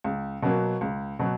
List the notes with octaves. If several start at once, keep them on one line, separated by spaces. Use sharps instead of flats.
C#2
B2 F#3 A#3
C#2
B2 F#3